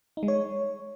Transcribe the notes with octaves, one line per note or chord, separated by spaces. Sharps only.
D#4
G#3
C#5